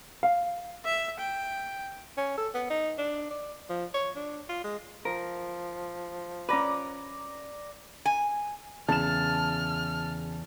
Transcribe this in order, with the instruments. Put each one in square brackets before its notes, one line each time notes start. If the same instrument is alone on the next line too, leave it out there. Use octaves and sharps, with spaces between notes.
[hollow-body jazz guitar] F5
[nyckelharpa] E5
G5
[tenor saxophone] C#4
A4
B3
D#4
D4
D5
F3
C#5
D4
F4
G#3
[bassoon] F3 [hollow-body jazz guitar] A#4
[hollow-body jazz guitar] C#4 B4 [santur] D5 A#5 D6
[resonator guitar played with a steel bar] G#5
[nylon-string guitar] E2 [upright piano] C#3 E7 [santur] A5 [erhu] F6